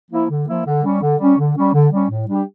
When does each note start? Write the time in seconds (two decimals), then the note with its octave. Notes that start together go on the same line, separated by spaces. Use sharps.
0.11 F3 A#3 E4
0.29 D3
0.47 F3 A#3 E4
0.65 D3
0.83 G3 C#4
1.02 D3
1.19 G3 C#4
1.37 D3
1.56 G3 C#4
1.73 D3
1.92 G3 C#4
2.10 A2
2.27 G3 D4 G4